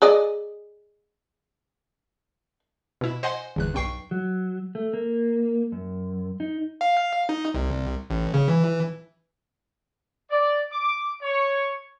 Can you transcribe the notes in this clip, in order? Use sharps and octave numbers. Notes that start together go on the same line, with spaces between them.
G#4 D5 D#5
B2 E4
C5 D#5 F#5 G#5 C6
G1 E2 F#6
B1 G2 G5 C#6 C7
F#3
A3
A#3
F#2
D#4
F5
D#4
C2
A1
C#3
E3
D5
D6
C#5